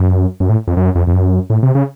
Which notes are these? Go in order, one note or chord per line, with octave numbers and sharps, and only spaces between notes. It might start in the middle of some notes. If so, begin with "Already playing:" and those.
Already playing: F#2
F#2
A2
F2
F#2
F2
F2
F#2
A2
C3
C#3